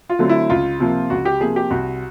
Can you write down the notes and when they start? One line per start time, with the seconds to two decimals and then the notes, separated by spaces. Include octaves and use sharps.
0.10 F4
0.19 D3 F#3 A3 C4
0.29 E4
0.50 C#2 F4
0.80 C3 F3 A#3
1.10 C#2 F#4
1.25 G4
1.40 C3 F3 A#3 G#4
1.56 G4
1.70 C2 F#4